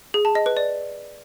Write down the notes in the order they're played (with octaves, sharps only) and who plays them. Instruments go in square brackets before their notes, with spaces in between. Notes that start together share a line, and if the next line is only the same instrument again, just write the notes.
[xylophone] G#4
A5
D#5
B4
D5